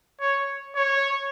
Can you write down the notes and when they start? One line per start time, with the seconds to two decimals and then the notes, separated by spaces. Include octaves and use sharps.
0.21 C#5
0.76 C#5